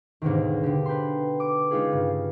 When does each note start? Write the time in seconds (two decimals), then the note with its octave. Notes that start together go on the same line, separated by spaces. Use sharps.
0.22 D#2 G#2 B2 D3 D#3
0.63 D3 G4
0.86 B4 G5 A#5 C6
1.40 D6
1.71 G#3 C#4 D#4 F4 G4 G#4
1.92 G2 C#3